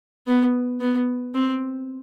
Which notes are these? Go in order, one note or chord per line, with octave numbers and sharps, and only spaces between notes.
B3
B3
C4